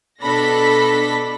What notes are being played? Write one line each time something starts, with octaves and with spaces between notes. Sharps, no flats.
B2 D4 A4 B5 A#6 B6